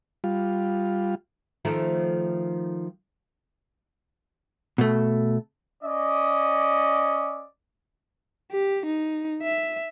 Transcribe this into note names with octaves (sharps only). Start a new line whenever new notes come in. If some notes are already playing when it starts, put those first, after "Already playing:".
G3 F4
D#3 F3 A3
B2 A3
C#4 D5 D#5
G4
D#4
E5